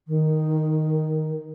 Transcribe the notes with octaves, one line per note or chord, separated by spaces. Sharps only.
D#3